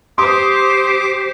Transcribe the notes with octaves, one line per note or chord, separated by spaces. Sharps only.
G4 C5 C6 D6 D#6